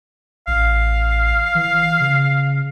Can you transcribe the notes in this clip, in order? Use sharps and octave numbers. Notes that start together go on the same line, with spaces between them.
A1 F5
E3
C#3